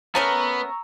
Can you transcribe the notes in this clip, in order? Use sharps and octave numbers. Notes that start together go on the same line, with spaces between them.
A3 B3 C#4 A#4 A#5 C#6 E6